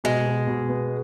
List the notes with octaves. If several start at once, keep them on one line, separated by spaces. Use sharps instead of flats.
B2 G#3
B2
B2
B3